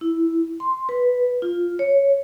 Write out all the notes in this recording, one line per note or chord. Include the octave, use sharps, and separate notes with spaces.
E4
C6
B4
F4
C#5